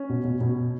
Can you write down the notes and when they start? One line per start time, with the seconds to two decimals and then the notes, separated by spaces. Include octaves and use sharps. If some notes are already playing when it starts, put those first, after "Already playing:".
Already playing: C#4
0.09 B2
0.24 B2
0.41 B2